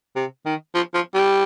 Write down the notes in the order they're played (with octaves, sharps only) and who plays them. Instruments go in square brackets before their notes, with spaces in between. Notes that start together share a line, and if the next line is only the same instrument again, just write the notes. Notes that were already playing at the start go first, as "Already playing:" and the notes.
[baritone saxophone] C3
D#3
F3
F3
G3